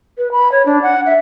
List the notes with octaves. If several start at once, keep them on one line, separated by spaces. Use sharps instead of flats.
B4
B5
C#5
D4
F#5
E5